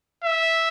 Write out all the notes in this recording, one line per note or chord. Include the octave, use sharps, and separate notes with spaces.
E5